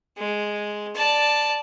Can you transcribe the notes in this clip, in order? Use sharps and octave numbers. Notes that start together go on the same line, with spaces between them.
G#3
D5 A5